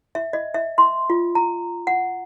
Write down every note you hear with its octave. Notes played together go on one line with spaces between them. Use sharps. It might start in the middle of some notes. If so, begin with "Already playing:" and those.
E5
D#5
E5
C6
F4
A#5
F#5